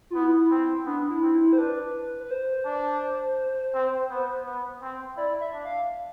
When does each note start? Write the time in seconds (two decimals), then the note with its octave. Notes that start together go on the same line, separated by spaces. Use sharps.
0.10 F4
0.15 B3 E4
0.51 C4
0.86 B3 D4
1.10 E4
1.22 C4
1.34 E4
1.53 C5
1.58 D4 B4
2.20 B4
2.31 C5
2.66 D4
3.74 C4
4.10 B3
4.46 B3
4.82 C4
5.17 E4 D5
5.41 E5
5.54 D4
5.65 F5